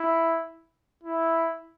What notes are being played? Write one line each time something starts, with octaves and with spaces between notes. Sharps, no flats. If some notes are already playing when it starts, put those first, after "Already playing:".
Already playing: E4
E4